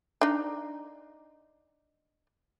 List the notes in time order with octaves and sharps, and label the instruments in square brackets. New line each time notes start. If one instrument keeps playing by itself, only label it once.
[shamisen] D4 D#4